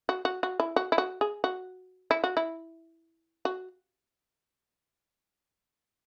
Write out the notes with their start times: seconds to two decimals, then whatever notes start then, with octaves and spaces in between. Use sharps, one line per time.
0.09 F#4
0.25 F#4
0.43 F#4
0.60 E4
0.76 F#4
0.92 E4
0.98 F#4
1.21 G#4
1.44 F#4
2.11 E4
2.24 F#4
2.37 E4
3.45 F#4